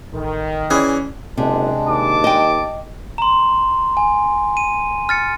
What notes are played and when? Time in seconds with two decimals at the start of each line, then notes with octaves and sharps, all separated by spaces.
0.13 A1 D#3
0.71 E3 C#4 G#4 D5
1.37 F#1 C3 G#3 D4
1.88 D#2 A5 D6
2.24 D#5 G5
3.18 A#5 C6
3.97 G#5
4.57 D#7
5.09 F6 A6 C#7